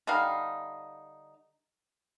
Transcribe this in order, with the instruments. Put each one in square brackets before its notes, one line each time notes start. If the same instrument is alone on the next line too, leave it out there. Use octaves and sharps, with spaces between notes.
[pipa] D3 G3 D#4 F5